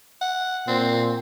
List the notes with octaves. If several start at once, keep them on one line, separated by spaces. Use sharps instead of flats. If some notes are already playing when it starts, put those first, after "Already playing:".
F#5
A#2 C4